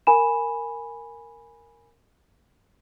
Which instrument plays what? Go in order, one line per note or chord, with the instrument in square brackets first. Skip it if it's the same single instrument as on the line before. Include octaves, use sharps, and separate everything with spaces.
[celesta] A#4 G#5 B5 E7